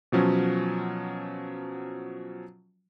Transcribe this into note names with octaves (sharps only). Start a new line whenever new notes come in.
B2 F3 F#3 C#4